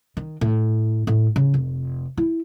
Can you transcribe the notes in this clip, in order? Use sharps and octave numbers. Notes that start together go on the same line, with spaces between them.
D#3
A2
A2
C#3
F1
E4